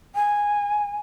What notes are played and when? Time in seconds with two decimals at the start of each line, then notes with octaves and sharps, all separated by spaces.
0.15 G#5